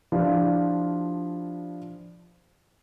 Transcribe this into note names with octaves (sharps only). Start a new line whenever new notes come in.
F3 D4 E4 F4 G4